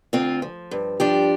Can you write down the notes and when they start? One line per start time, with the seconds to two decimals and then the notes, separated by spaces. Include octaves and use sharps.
0.13 D2 C4 F4
0.42 F3
0.71 G2
1.00 F3 D4 G4